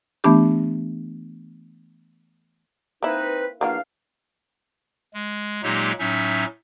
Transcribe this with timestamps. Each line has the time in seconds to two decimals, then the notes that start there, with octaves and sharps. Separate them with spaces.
0.24 E3 A3 B3 D4 G4
3.03 A#3 C4 D#4 E4 B4
3.61 E2 F3 F#3 A#3 D4 F5
5.14 G#3
5.63 A#2 F#3 G#3 A#3 D#4 G4
5.99 A2 F#3 C#4 D#4 E5